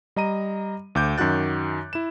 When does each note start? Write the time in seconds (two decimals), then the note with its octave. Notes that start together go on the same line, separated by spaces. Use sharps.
0.16 G3 D#5 A#5 D#7
0.95 D2 D6 G6
1.18 F#2 D#3 F#4 F#6 A6
1.93 E4 E7